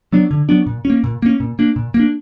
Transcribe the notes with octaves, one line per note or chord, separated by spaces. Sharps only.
F#3 B3 D4
D3
F#3 B3 D4
A#2
C#4
A#3
A#2
A#3 C#4
A#2
A#3 D4
A#2
A#3
D4